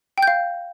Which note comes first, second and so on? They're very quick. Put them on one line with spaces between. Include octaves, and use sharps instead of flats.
G5 G6 F5